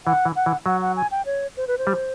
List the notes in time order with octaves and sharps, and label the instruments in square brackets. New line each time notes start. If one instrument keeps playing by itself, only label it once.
[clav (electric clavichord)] E3 [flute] F#5
[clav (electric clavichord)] E3
[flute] F#5
[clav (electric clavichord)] E3
[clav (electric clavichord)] F#3 [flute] F#5
[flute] F#5
G#5
G5
C#5
C5
B4
C5
[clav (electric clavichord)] G3